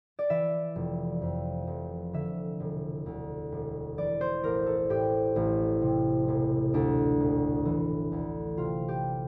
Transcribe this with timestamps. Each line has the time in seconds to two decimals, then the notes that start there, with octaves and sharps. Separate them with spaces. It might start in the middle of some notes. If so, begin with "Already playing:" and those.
0.19 D5
0.30 E3 E5
0.76 F1
1.22 F2
1.67 F1
2.13 D3 E5
2.60 E1
3.06 D2
3.52 E1
3.98 E3 D5
4.21 C5
4.43 A1 A#4
4.66 A4
4.89 A2 G4
5.36 A1
5.81 C3
6.28 E1
6.74 D2 D4
7.20 E1
7.65 E3
8.12 D2
8.57 C3 F4
8.88 G4